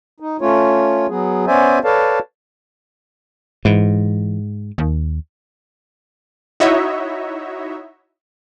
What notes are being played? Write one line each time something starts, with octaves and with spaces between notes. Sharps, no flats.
D#4
A3 C#4 F4 C#5
F#3 B3 G#4
B3 C#4 C5 D5 E5 G#5
A4 B4 C#5 D5 F5 A5
G#2 E3
D#2
D#4 E4 F#4 C#5 D#5 E5